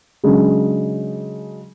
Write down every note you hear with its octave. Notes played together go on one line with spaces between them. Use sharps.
C#3 F#3 G#3 D4